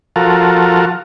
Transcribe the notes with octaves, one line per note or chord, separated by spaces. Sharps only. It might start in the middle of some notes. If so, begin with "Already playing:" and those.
F3 F4 F#4 A4 A#4